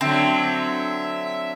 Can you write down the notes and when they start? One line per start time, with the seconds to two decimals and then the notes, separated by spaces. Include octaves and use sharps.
0.01 D3 F#3 C4 E5